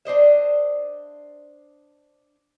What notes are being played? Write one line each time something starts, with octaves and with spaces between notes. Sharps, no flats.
D4 C5 D#5 E5